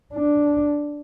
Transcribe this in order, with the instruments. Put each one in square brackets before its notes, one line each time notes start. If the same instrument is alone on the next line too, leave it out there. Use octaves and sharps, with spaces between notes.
[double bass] D4